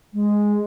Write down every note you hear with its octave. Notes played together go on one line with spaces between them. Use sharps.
G#3